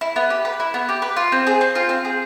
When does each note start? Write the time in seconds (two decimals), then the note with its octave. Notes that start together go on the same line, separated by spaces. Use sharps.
0.01 E4
0.16 B3
0.30 G4
0.45 B4
0.60 E4
0.74 B3
0.89 G4
1.02 B4
1.17 F4
1.32 C4
1.47 G#4
1.61 C4
1.75 F4
1.89 C4
2.05 G#4